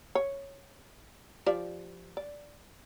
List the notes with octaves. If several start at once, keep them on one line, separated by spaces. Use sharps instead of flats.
C#5
F3 G4 D5
D5